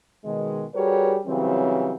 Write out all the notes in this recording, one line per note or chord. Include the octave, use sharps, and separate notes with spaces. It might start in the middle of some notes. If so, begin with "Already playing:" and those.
B2 D#3 G#3
G3 F#4 G#4 A#4 B4 C#5
C#3 E3 F#3 G3 C4